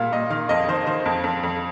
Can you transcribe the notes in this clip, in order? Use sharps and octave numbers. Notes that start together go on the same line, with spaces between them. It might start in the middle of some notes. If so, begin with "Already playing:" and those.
Already playing: A#2 G3 A#3 F5
A#2 D#5
D#3 F5
F2 D#5
D#3 C5
D#3 C5
F2
F2
F2